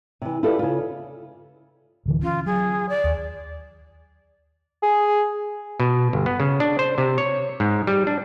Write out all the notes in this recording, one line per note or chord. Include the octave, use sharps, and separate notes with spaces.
C3 E3
E4 F4 G4 A4 B4 D5
C#3 F4
D1 D3 E3
C#4 F4
F#3 G#4
D5
D#2
G#4
B2
G1
B3
C#3
D4
C5
C3
C#5
G#2
G3
D4